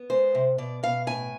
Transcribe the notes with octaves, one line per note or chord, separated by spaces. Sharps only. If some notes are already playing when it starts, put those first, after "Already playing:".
Already playing: B3
G#3 C5
C3
B2 D5
B2 F5
A2 G#5